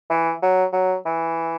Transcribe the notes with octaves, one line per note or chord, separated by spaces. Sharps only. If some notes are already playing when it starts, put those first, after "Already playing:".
E3
F#3
F#3
E3